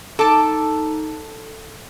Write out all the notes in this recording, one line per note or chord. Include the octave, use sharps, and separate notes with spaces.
D#4 A4 A5 D6